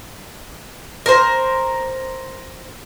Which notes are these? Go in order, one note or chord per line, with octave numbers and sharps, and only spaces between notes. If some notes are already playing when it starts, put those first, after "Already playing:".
A#4 C5